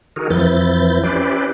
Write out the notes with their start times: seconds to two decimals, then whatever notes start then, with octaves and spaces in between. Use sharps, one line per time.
0.16 D#3 F#4 G#4 A#4
0.30 F2 E3 F3 E4 G6 A6
1.03 C#4 E4 G4 B4 C5 D5